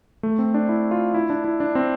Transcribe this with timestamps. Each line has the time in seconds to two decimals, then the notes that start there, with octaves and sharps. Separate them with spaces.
0.23 A3
0.39 C4
0.54 D4
0.69 E4
0.91 F4
1.14 E4
1.30 D4
1.44 E4
1.60 D4
1.75 C4